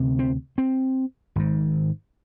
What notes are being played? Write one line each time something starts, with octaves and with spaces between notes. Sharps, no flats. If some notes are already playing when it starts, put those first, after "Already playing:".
Already playing: D2 C3
C4
C4
G#1 G#2